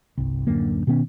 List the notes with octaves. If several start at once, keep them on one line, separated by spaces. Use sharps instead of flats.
G1 C2
D1 F#2 D3 A#3
B2 D#3 B3 C#4